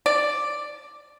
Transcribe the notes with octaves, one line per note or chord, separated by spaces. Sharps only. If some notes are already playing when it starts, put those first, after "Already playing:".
D5